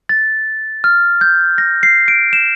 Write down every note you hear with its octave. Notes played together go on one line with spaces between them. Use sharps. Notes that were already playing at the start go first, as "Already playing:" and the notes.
A6
F6
G6
A#6
C7
D7
E7